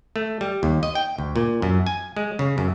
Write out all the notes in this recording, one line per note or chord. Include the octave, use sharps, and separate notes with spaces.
A3
G3
D#2
D#5
G5
D2
A#2
F#2
G#5
G#3
C#3
F#2